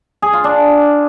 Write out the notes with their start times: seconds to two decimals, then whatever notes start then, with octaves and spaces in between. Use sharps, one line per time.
0.22 G#4
0.33 F4
0.44 D4